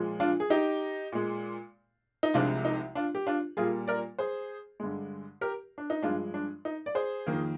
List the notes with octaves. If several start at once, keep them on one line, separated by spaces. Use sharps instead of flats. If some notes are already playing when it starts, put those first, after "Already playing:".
Already playing: A#2 F3 G#3
D4 F4
G#4
D#4 G4
A#2 G#3
D#4
C2 C3 F3 G#3 D4 F4
D#4
D4 F4
G4
D4 F4
A#2 G3 A#3 F4 G#4
A#4 D5
G#4 C5
G2 D3 G#3
G4 A#4
D4
D#4
G2 F3 G#3 D4 F4
D4
D#4
D5
G#4 C5
F2 D#3 A#3